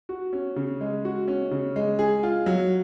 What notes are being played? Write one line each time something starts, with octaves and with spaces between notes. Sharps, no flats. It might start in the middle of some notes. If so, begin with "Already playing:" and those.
F#4
C#4
C#3
G#3
F#4
C#4
C#3
G#3
G#4
F4
F#3